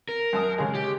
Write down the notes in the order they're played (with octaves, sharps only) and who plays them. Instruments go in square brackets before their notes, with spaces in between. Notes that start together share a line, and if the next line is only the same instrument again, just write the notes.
[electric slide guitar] A#4
[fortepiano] F#2 A5 D#6
C#3 G#3
[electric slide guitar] G4